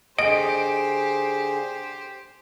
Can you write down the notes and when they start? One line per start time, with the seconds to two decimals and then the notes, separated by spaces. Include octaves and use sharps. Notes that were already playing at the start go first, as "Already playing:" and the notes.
0.18 D3 G4 G#4 C5 D#5 D7